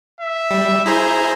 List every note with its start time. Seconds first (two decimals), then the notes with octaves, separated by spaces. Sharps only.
0.21 E5
0.51 G3
0.86 E4 G#4 C5 A#5